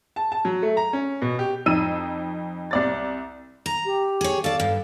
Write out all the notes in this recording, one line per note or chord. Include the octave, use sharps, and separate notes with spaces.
A5
A5
F#3
A3
A#5
C#4
B2
G4
F2 D#4 E6 D#7
C2 D5 A6
A#5
G4
G#4 C#5
A4 D5 F5
G2